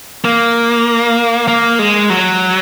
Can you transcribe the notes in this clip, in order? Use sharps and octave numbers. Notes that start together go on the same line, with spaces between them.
A#3
A#3
G#3
F#3